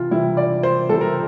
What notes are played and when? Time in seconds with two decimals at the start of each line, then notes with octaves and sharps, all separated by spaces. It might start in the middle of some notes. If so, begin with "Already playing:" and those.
Already playing: C3 E3 F4
0.11 C3 E3 G3 E4
0.37 D5
0.63 C5
0.89 C3 E3 G3 A4
1.01 A#4